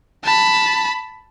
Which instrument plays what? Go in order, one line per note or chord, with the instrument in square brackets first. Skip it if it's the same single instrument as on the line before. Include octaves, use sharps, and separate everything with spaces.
[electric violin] A5 B5